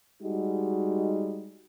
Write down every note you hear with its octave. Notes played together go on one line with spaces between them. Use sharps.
G3 G#3 D#4 F#4